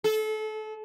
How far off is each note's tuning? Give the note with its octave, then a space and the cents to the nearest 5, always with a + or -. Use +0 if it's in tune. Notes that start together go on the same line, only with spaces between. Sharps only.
A4 -30